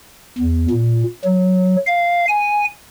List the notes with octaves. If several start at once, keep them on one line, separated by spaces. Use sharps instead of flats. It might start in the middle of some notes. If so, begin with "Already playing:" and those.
E2
A#2
F#3
F5
G#5